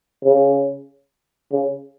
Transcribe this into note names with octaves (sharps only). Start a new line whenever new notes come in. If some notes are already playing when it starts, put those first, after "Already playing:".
C#3
C#3